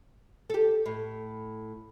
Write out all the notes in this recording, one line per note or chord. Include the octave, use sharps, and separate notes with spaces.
G4 A4
A2